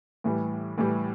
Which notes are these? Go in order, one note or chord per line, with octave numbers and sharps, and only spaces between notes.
A2 E3 G3
A2 E3 G3